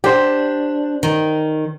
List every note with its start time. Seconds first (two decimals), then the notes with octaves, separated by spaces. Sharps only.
0.04 D4 G4 C5
1.03 D#3